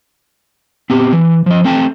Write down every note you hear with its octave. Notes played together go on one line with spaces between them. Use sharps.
B3 C4 G4
E3
F3 D#5
A3 C4 G5 A5